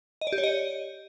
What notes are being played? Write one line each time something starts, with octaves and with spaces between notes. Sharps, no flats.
D#5
D5
G4
C#5
D#5